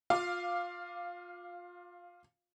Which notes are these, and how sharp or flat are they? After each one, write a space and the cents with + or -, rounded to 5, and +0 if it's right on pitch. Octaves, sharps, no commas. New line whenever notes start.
F4 +25 F5 +0 D6 +0